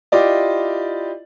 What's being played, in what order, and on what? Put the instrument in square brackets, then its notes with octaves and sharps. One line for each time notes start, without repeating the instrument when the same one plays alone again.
[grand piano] E4 F4 G4 D5 D#5